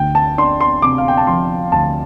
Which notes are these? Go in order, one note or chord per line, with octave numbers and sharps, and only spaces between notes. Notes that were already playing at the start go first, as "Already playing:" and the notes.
Already playing: D2 G5
A5
D4 C6
C6
C3 D6
F5
G5
A5
F3 C6
D2 A5